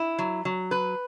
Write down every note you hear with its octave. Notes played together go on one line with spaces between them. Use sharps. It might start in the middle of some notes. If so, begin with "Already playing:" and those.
Already playing: E4
F#3
F#3
B4